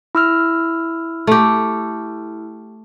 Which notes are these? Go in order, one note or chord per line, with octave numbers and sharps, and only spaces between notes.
E4 E6 F6
A3 G4